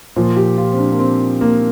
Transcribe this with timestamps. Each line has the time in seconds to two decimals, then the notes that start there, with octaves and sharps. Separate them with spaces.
0.16 A#2 F3 C5
0.36 G4
0.58 F4
0.73 C4
0.78 D4
0.92 A#3
0.99 C4
1.41 A#3